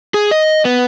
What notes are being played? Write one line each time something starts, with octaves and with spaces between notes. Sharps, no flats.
G#4
D#5
B3